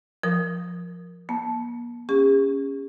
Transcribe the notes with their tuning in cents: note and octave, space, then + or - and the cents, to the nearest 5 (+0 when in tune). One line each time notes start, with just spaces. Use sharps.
F3 +5 A#4 +0 D#6 +0
A#3 +45 A5 -15
C#4 +0 G#4 -45